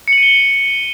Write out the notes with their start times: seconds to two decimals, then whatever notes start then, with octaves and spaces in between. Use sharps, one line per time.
0.08 C#7
0.13 F#7
0.18 D#7
0.23 G7